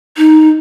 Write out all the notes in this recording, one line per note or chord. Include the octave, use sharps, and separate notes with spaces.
D#4